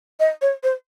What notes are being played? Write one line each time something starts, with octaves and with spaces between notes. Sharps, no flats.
D#5
C#5
C5